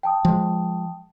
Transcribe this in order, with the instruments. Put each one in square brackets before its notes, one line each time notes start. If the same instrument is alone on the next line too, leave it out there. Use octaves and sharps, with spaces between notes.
[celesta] G5 A5 D#6
[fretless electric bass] F3 G#3